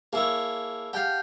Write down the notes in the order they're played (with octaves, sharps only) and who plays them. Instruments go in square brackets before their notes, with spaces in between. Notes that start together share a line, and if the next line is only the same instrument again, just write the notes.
[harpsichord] A#3 E4 C#5 [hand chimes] G#4 A5
[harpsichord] G4 F5 [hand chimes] F#5 A5 G6